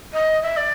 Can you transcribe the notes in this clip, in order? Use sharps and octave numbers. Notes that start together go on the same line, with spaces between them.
D#5
E5
D5